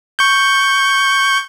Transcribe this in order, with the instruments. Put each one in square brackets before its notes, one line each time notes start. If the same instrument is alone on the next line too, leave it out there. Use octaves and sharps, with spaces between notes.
[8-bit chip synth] C#6 G6